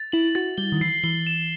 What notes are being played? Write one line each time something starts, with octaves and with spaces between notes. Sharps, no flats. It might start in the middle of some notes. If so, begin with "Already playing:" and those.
Already playing: A6
E4 F#7
F#4 A6
G3 G7
D#3
E3 C7
E3 G7
E7